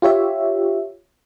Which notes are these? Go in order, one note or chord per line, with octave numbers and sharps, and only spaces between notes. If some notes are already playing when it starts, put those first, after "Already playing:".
F4 G4 C#5 E5